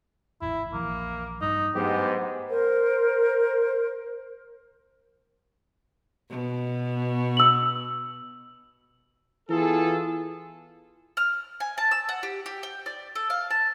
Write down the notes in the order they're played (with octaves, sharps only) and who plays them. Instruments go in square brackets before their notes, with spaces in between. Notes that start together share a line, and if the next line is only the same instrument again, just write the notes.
[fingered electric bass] G#1 E2 [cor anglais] E4
[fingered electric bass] A#1 E3 F3 [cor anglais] A#3
[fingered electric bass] G2 [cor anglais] D#4
[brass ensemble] G#2 B3 [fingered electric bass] F#3 A3 D4 [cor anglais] G4
[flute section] A#4 C5
[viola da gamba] B2
[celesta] E6 F#7
[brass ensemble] E3 B3 F4 G#4 A4
[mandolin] F6
G#5
A5
E6
F#5
G4
G4
G5
D5
A4
F5
A5